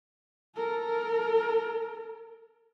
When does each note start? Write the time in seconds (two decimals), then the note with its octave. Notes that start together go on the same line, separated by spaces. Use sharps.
0.56 A4 A#4